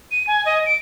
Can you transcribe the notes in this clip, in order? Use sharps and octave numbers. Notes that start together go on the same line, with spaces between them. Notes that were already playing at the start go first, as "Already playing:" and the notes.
D#7
G#5
D#5
D7